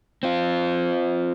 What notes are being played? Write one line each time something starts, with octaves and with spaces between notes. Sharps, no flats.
C4 F4